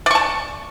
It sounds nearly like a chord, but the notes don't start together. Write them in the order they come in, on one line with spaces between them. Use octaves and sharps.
D5 C#6 A5